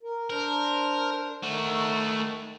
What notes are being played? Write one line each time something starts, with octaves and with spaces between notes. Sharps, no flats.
A#4
D4 A#4 C5
D#3 A3 F#4